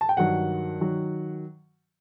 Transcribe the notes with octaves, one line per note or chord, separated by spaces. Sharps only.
A5
G5
G2 D#3 F#3 F#5
D#3 F#3